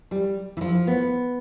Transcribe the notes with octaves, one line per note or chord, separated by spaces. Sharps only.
G3
E3
F3
B3